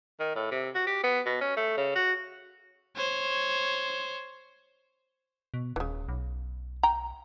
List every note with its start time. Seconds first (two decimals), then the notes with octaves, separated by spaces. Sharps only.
0.20 D#3
0.36 A2
0.51 C3
0.75 F#4
0.87 G4
1.04 B3
1.26 B2
1.41 C#4
1.57 A3
1.77 C#3
1.95 F#4
2.96 C5 C#5
5.54 B2
5.76 D#1 C#3 E3
6.09 B1
6.83 G5 A#5